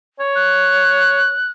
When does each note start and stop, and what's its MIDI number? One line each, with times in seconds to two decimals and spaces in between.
0.20 1.33 73
0.35 1.51 90